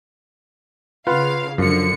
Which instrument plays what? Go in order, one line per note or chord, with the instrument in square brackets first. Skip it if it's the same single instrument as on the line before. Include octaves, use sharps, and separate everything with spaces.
[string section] C#3 F5 [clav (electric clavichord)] F4 B4 F#5
[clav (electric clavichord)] F#2 F3 [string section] D3 C#7